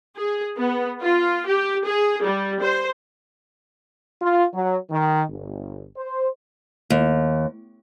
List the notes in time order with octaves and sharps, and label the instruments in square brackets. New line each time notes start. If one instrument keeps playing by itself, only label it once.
[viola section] G#4
B3
F4
G4
G#4
G3
C5
[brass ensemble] F4
F#3
D#3
G1
C5
[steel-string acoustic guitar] D#2